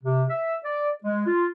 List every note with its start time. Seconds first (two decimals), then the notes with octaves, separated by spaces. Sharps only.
0.04 C3
0.29 E5
0.64 D5
1.04 G#3
1.26 F4